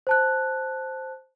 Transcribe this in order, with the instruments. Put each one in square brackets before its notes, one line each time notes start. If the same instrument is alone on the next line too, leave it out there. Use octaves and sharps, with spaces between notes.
[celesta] C5 A5 F#6